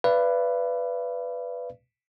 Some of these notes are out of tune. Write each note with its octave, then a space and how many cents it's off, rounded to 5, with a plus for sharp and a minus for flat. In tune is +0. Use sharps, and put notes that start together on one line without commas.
B4 +0 D5 -5 F5 -45